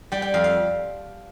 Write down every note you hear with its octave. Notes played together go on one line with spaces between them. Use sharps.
G3 G5
G5
F2 F5
F5